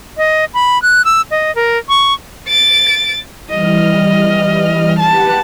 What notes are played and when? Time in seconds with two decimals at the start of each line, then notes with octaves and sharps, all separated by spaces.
0.17 D#5
0.54 B5
0.82 F#6
1.05 E6
1.31 D#5
1.55 A#4
1.89 C#6
2.49 A6 D7
3.50 E3 G3 D#5 F6
5.00 G4 B4 F#5 A5